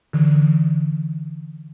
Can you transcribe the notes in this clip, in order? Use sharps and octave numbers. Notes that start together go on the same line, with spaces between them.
D3 E3